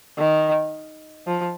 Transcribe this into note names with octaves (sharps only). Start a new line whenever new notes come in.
D#3
F3